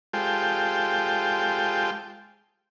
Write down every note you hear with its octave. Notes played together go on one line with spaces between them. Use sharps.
G#3 F4 G4 A4 C5 G5